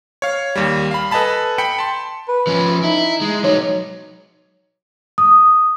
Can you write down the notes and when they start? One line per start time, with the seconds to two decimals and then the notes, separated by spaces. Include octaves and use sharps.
0.22 C#5 F5
0.55 D#2 G3
0.91 F5 B5
1.11 A4 B4 D#5 G#5 A5 B5
1.58 G5 B5 B6 C#7
1.79 A5 C6
2.29 B4
2.47 F3 C#4
2.84 D#4 E4
3.21 G#3
3.44 F#3 D#4 C#5
5.18 D#6